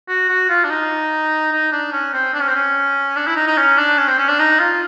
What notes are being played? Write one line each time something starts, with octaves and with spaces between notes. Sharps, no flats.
F#4
F#4
F4
D4
D#4
D#4
D4
C#4
C4
D4
C#4
C4
C#4
D4
E4
D#4
D#4
C#4
D4
C#4
C4
C#4
D4
D#4
F4